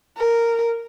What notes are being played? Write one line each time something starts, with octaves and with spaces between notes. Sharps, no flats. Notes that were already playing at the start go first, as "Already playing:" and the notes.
A#4